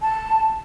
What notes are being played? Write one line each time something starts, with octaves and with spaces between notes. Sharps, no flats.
A5